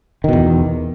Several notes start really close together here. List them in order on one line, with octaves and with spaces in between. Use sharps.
D#3 B2 E2